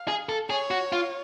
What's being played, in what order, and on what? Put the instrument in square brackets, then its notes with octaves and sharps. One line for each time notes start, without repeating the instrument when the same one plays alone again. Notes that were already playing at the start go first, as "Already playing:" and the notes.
Already playing: [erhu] F5
[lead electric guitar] G#4
A4
[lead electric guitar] G#4 [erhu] C#5
[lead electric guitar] F#4
F4